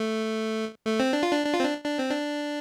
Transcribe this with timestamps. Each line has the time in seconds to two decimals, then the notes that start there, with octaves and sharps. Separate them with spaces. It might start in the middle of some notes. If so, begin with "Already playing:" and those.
Already playing: A3
0.86 A3
1.00 C4
1.13 D4
1.23 F4
1.32 D4
1.46 D4
1.54 F4
1.60 C4
1.64 D4
1.84 D4
1.98 C4
2.10 D4